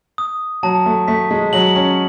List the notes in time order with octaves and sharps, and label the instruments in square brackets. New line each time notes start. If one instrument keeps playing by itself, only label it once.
[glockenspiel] D#6
[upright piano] F#3 [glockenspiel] A5
[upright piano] A3
[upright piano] A3 [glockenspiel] B6
[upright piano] G#3
[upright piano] F#3 [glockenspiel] F#7
[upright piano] C#4